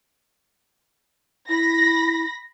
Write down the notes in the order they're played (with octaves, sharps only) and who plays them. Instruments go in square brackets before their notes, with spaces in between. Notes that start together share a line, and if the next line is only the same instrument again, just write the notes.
[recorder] E4 [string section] B5 A#6